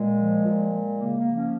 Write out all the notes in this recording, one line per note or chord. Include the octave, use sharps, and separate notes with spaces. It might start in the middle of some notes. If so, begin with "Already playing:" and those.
Already playing: A#2 G#3
F3
A#2
G#3
C#3 A#3
A#3
F3
A#3 C#4